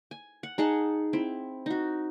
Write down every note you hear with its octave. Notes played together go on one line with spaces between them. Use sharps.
G#5
F#5
D#4 G#4 F#5 A5
C4 E4
D#4 F#4